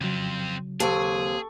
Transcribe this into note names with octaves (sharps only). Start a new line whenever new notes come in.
F2 C#3 F#3 C4
D#2 C4 G#4 A4 C#6